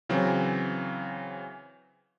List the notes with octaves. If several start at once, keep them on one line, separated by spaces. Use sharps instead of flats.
C#3 E3 F#3 C4